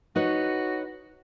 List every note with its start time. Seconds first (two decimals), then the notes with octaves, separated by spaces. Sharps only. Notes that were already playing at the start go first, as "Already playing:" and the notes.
0.16 D#4 F#4 B4 C#5